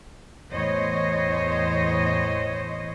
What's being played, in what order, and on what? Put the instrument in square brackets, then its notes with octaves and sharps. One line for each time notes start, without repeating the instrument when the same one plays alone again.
[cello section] E2 A2 C5 C#5 D#5